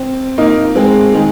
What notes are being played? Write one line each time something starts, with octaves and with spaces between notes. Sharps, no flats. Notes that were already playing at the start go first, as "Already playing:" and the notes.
Already playing: C4
A#3 D#4
G#3 C4
D#3 G#3